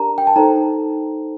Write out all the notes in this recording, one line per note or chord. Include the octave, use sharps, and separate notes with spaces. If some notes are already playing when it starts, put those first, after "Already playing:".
Already playing: D4 G4 A#4 D5 A5 A#5
G5
A5
D#4 A4 C5 A#5